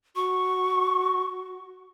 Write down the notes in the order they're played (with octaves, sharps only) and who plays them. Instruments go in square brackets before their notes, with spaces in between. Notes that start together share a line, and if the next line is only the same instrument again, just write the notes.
[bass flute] F#4 [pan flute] C#6